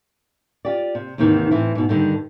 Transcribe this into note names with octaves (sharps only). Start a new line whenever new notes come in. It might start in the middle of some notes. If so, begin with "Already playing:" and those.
F4 G4 D5
C3
D#2 G#2 C3 D#3 E3
A2 E3 C4 E4
G#2 B2
G2 D3 D#3 G3